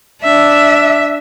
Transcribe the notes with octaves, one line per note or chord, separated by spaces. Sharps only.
D4 E5